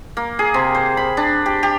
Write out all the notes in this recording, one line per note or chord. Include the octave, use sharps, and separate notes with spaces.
A#3
G#4
C3
C5
B5
D4
G4
G4